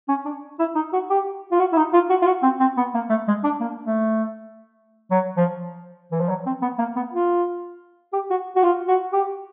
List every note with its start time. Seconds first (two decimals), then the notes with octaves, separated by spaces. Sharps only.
0.09 C#4
0.25 D4
0.59 E4
0.75 D#4
0.93 F#4
1.10 G4
1.52 F4
1.59 F#4
1.73 E4
1.77 D#4
1.93 F4
2.10 F#4
2.22 F4
2.26 F#4
2.43 C4
2.60 C4
2.77 B3
2.94 A#3
3.10 A3
3.28 G#3
3.44 D4
3.60 A#3
3.86 A3
5.11 F#3
5.37 F3
6.12 E3
6.21 F3
6.29 F#3
6.46 C4
6.62 B3
6.78 A#3
6.96 B3
7.13 F4
8.13 G4
8.30 F#4
8.56 F#4
8.63 F4
8.88 F#4
9.13 G4